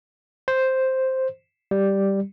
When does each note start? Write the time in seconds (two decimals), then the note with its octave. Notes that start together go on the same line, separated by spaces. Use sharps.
0.48 C5
1.71 G3